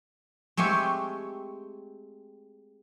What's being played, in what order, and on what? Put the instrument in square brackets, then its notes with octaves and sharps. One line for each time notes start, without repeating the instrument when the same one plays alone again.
[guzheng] G#3 A3 C4 G4 C#5